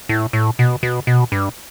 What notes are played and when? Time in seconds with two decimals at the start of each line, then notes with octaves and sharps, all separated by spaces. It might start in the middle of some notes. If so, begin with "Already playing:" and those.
0.09 A2
0.33 A2
0.59 B2
0.83 B2
1.07 B2
1.32 G2